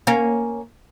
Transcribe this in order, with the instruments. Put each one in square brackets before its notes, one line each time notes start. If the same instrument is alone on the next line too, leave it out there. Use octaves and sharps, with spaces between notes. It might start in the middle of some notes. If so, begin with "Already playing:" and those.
[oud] A#3 C#4